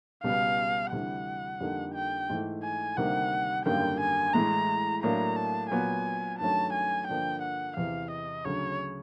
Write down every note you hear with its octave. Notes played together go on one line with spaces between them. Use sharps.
C#2 B2 G3 B3 F5
D2 C3 E3 G3 F#5
F2 D3 G3 A#3 D#4
G5
G#2 E3 A3
G#5
D2 C3 D#3 G3 A#3 F#5
G#1 F#2 D3 G3 A#3 G5
G#5
A2 E3 G#3 A#5
A2 F#3 A#3 D4 A#5
A5
A#2 F#3 B3 G#5
G2 D#3 F#3 A3 C#4 A5
G#5
G2 D3 F3 A#3 D4 G5
F#5
E2 C3 E3 F5
D#5
D2 C#3 F#3 C#5